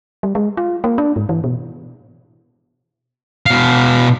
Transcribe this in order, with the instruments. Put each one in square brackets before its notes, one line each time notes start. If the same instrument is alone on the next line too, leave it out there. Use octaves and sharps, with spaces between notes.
[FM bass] G3
G#3
F4
A#3
D4
G#2
E3
B2
[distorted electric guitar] B2 F5